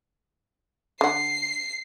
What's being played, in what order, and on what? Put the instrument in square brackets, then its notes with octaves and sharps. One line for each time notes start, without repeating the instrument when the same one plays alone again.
[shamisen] D3 F#5 [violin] C7